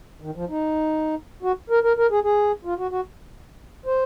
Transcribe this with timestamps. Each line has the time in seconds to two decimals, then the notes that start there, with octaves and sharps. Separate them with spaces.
0.21 D#3
0.35 F3
0.49 D#4
1.43 F#4
1.70 A#4
1.83 A#4
1.97 A#4
2.11 G#4
2.24 G#4
2.65 F4
2.78 F#4
2.91 F#4
3.86 C5